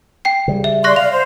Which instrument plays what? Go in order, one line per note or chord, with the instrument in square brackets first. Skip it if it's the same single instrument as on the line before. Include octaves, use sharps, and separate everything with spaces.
[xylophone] G5 C7
[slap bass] C#3 G3
[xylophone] E5
[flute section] D5 C6 [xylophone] C#6 F#6 A#6
[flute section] F5 [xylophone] F7
[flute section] C5